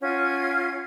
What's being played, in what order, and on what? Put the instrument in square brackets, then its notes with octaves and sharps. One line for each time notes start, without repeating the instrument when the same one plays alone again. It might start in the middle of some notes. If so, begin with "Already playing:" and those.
[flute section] C#4 F4 F#5 G#6